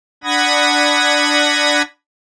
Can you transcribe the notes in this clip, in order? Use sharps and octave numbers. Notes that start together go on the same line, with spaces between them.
D4 F#5 B5 D#6 G#6 A#6